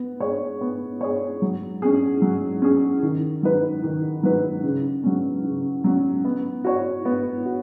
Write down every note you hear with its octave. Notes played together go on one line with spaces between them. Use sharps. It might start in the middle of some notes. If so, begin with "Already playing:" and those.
Already playing: B3
G#4 C#5
B3
G#4 C#5
F#3
C#4 G#4
F#3
C#4 G#4
D#3
F#3 D#4 B4
D#3
F#3 D#4 B4
C#3
F#3 C#4
C#3
F#3 C#4
B3
F#4 C#5
B3
F#4